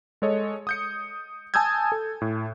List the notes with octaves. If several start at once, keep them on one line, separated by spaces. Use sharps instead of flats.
G#3 A4 C#5 D#5
D#6 G6 C#7
G#5 A5 D#6 E6 G6 G#6
A4
A2